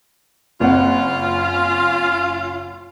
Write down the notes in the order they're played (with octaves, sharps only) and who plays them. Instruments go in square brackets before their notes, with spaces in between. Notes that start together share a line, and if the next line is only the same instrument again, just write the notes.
[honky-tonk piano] F#1 C4 F#5 [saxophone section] C#4 F4